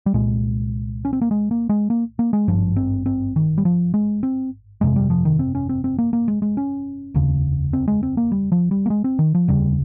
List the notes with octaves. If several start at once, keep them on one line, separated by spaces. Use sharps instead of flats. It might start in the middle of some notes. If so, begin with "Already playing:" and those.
G3
C2 A#2 G#3
C#4
C4
A#3
G#3
A#3
G#3
A#3
A#3
G#3
G#1 G2 F3
C4
C4
D#3
G3
F3
G#3
C4
G1 F2 C3 G#3
G3
F3
D#3
C4
C#4
C4
C4
A#3
A#3
G#3
G#3
C#4
F1 D#2 C#3
C4
G#3
C4
A#3
G3
F3
G3
A#3
G#3
C4
D#3
F3
F1 D#2 C#3 G3